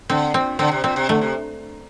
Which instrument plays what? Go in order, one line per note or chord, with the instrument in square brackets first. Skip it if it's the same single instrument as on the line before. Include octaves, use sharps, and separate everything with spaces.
[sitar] D3 [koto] C4
[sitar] A#2 [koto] C4
[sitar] D3 [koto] C4
[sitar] C3
[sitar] A#2 [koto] C4
[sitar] C3
[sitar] D3 [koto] A3
[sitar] C3